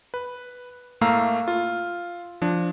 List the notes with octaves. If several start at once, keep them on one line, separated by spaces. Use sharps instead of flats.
B4
A2 A3 A#3 F5 A#5 E6
F4
F3 D4